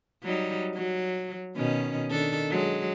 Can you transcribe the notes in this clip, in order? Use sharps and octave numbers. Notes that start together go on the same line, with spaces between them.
F#3 G3 D#4
F#3
B2 D#3 C#4
D#3 D4 A4
F#3 G#3